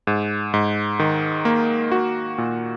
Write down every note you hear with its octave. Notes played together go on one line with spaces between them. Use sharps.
G#2
G#2
D#3
A#3
F#4
A#2